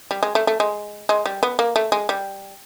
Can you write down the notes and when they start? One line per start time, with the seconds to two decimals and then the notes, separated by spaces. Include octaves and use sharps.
0.11 G3
0.23 G#3
0.35 A3
0.47 A3
0.60 G#3
1.09 G#3
1.26 G3
1.43 B3
1.59 A#3
1.76 A3
1.92 G#3
2.09 G3